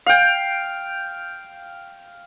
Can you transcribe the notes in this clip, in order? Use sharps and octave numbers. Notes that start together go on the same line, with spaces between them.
F5 G5